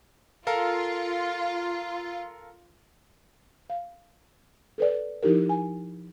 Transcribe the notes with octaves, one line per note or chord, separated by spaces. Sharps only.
F4 A4 A#4 F5
F5
A4 B4 D5
F3 D#4 E4 G4 A#4
G#5